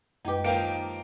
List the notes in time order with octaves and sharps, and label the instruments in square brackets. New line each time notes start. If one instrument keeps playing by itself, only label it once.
[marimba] F#2 G#3 B4 [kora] D#4 G4
[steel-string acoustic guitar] D#3 F3 A#3 [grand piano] G5 D7